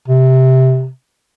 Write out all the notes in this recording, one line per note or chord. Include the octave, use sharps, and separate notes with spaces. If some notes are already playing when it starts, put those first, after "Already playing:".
C3